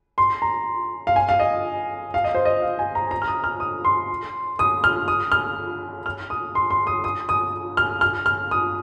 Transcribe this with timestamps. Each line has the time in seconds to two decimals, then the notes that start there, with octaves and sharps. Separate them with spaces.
0.18 C6
0.42 A#5
1.07 F5
1.16 G#5
1.29 F5
1.39 D#5
2.14 F5
2.24 D#5
2.35 C5
2.45 D#5
2.62 F5
2.79 G#5
2.95 A#5
3.11 A#5
3.22 F6
3.27 D#6
3.44 F6
3.60 D#6
3.85 C6
4.59 D#6
4.84 F6
5.08 D#6
5.32 F6
6.06 F6
6.30 D#6
6.55 C6
6.70 C6
6.87 D#6
7.04 D#6
7.29 D#6
7.77 F6
8.01 F6
8.26 F6
8.51 D#6